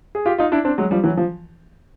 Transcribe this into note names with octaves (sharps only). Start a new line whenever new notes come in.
G#4
F4 G4
D#4 F4
D4 E4
C4 D4
F#3 G#3
F3 G3
E3 F#3
F3